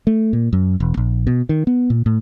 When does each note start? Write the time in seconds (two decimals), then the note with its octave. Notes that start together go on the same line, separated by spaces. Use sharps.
0.07 A3
0.33 A#2
0.53 F#2
0.80 E1
0.97 A#1
1.27 B2
1.49 D#3
1.67 B3
1.90 A#2
2.06 A2